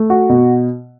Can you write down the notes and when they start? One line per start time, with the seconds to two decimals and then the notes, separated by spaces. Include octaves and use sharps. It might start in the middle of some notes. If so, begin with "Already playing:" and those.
Already playing: A3
0.10 F#4
0.29 B2